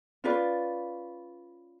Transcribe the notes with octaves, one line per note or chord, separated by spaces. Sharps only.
C#4 F4 B4 D5